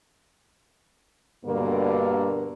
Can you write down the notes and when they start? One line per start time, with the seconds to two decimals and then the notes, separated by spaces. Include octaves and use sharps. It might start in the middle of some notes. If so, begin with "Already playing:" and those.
1.44 G2 B2 D3 A#3